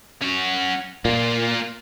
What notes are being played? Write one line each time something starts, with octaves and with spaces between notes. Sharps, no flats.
C#4 F#4
A#2 A#3 F4